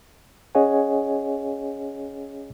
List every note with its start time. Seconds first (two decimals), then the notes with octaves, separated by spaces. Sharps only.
0.55 C#4 G#4 C#5 D#5 F#5 G#5